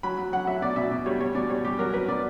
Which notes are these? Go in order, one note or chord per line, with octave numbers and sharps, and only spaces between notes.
F#3 B5
F#3
F#3 F#5
F#3 E5
B2 D5
B2 E5
B2 D5
G3 C#5
G3 C#5
B2 D5
G3 C#5
G3 G4
F#3 A#4
F#3 B4
B2 D5